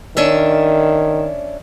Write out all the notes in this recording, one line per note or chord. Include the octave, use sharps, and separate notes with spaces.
D#3 C#4 D4 E5